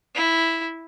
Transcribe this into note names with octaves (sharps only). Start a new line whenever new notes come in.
E4